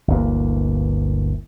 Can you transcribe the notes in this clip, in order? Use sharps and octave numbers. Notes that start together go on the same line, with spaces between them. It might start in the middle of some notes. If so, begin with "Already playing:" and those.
G1 D2 E3 A#3